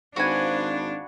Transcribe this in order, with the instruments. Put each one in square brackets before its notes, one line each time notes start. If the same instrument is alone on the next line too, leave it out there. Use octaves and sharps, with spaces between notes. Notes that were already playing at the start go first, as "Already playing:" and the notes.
[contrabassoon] G#1 [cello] D4 [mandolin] F#4 B4 G#5 [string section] C5 F5